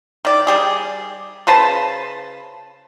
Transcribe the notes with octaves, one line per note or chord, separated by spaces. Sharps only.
D#3 D5
G3 G4 G#4
C#3 B4 C5 A5